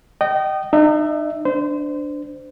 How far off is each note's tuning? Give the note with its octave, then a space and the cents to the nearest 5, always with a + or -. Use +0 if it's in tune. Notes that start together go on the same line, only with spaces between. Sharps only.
D#5 -20 G5 -30
D#4 -35 E5 +0
D4 +0 C5 -25